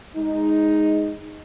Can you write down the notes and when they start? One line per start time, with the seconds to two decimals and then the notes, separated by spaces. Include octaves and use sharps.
0.16 G#3 D#4